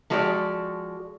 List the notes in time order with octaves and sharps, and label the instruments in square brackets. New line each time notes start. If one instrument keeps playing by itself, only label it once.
[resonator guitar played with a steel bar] F3 G#3 F#4 G4 A4 D5